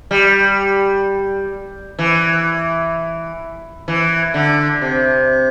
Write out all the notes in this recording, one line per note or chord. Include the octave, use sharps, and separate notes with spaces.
G3
E3
E3
D3
C3